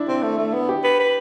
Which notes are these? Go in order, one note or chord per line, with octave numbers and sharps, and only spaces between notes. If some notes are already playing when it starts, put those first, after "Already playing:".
Already playing: D4 E4
C4
A3
A3
B3
G4
B4
B4